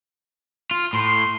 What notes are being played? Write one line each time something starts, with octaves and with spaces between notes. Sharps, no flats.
F4
A2 C6